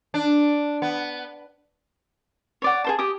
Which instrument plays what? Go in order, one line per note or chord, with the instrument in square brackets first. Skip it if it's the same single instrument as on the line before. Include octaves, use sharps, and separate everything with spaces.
[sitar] D4
B3
[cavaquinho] C#5 D5 F#5
G#4 C5 A5
G4 D#6